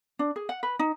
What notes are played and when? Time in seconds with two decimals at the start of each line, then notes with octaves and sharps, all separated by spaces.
0.19 D4
0.36 G#4
0.49 F#5
0.63 B4
0.79 D#4